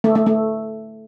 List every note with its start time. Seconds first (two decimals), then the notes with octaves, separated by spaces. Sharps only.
0.04 A3
0.15 A3
0.26 A3